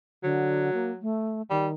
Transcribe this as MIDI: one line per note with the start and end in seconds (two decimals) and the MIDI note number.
0.23 0.72 50
0.23 1.02 54
0.74 0.91 58
1.02 1.42 57
1.50 1.74 51
1.50 1.68 55